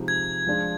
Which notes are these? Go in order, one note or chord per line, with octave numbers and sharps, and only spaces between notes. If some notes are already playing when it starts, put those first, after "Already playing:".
Already playing: C3 F3 G#3 D#4
G#6
F3 G#3 D4 F4